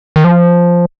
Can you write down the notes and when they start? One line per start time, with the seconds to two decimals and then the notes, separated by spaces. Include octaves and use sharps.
0.16 D#3
0.24 F3